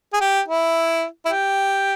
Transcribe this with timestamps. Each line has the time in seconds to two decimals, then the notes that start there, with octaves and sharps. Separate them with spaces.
0.13 G#4
0.21 G4
0.48 E4
1.25 E4
1.28 G4